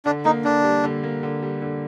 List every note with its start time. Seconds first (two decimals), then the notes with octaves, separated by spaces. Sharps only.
0.05 D3 D4
0.25 A#3 D#4
0.44 D3 D4
0.64 G3
0.84 D3
1.03 A#3
1.23 D3
1.43 G3
1.62 D3